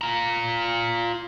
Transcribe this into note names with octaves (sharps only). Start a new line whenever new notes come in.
F4 A#5